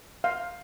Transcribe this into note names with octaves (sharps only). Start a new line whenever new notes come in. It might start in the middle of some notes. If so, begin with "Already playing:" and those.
F5